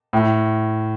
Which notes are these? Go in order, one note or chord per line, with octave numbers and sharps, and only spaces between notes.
A2